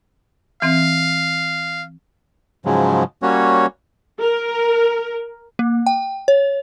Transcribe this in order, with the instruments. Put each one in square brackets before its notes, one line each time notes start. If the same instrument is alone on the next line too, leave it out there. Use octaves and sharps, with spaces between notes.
[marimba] E3 C4 [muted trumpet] F5
[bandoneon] G#2 C#3 F3 F#3 G#3
G3 A#3 C#4 F#4 C#5
[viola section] A#4
[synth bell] A#3
G5
C#5